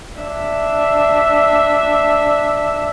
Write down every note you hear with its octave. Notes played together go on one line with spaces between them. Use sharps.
D4 E5